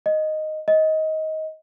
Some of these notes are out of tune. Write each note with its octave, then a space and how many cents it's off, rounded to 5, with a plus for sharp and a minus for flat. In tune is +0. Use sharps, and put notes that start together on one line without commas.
D#5 -5
D#5 +20